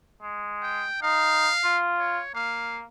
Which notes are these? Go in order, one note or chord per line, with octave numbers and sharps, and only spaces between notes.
G#3
G5
D#4 F5
F4
C#5
A#3 F5